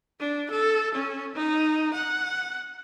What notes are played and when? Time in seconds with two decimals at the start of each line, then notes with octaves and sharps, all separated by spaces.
0.20 D4
0.51 A4
0.95 C#4
1.35 D#4
1.94 F#5